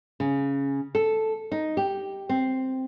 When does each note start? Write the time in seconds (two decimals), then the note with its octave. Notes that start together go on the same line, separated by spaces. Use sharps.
0.20 C#3
0.95 A4
1.52 D#4
1.77 G4
2.29 C4